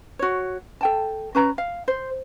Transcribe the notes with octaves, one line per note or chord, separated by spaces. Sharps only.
F#4 C#5
A4 G5 A5
C#4 B4 A#5
F5
C5